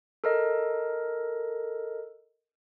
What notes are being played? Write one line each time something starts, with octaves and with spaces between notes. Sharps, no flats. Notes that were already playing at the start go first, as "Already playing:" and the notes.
A4 A#4 D#5